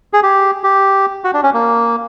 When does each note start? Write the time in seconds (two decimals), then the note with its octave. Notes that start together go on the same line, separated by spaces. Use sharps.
0.13 G#4
0.23 G4
0.63 G4
1.24 F#4
1.34 D4
1.43 C#4
1.54 A#3